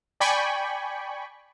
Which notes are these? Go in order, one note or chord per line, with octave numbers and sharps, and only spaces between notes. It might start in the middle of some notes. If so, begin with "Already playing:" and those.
D5 G5 G#5 B5 C#6